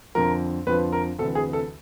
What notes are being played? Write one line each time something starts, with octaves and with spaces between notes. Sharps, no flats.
F2 D3 F3 A#4
F2 D3 F3 B4
A#4
D2 C3 E3 A4
G#4
A4